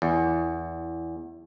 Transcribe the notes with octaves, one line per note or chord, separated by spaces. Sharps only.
E2